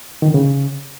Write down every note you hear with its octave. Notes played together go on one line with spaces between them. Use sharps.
D#3
D3
C#3